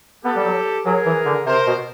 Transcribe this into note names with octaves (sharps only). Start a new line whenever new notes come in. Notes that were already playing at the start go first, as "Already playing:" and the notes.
B3 G4 A4
G3
F#3
F#3 G#4 A#4
E3
D3
C3 A#4 C5
B2